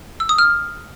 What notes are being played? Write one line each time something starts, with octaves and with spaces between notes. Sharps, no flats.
E6
D#6
F6